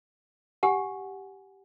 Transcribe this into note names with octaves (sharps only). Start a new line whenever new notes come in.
G4 F#5 G#5